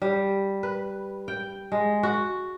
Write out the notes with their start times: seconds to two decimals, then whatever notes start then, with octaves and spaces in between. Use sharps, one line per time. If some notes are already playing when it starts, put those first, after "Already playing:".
0.02 G3
0.63 B4
1.28 G5
1.72 G#3
2.03 F#4